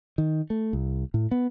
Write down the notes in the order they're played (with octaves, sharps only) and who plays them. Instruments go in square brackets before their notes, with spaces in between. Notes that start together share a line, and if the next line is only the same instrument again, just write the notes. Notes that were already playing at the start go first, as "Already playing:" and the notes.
[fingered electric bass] D#3
A3
C2
A2
B3